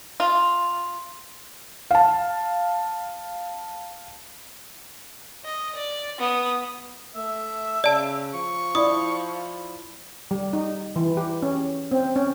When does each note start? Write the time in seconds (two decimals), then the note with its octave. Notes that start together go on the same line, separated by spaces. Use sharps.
0.20 F4
1.91 F5 A5
5.44 D#5
5.75 D5
6.19 B3 D#6
7.15 A3 E5
7.84 C#3 D5 A5
8.34 F3 C#6
8.75 E4 D5 D#6
10.31 G3
10.53 D#4
10.96 E3
11.17 G4
11.43 C#4
11.92 C4
12.16 C#4